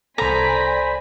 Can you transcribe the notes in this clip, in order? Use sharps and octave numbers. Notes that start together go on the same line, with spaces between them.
C2 A4 C5 D5 G#5 A#5 B5 B6